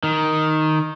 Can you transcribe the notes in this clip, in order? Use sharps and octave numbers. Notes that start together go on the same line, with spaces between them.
D#3